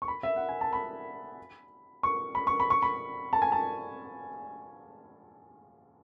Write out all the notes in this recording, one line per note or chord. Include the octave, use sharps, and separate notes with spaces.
C#6
B5
E5
F#5
G#5
A5
B5
C#6
B5
C#6
B5
C#6
B5
A5
G#5
A5